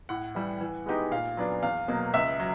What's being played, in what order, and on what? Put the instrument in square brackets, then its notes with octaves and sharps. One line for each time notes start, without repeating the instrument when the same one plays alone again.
[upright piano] A2 [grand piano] F#5
[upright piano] E3 G3
E3
G#3 B3 D#4 G4
[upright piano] A#2 [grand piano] F5
[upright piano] F#3 B3 D4
[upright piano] E2 [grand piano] F5
[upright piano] B2 F#3 A#3
[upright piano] C#2 [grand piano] E5
[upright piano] F#3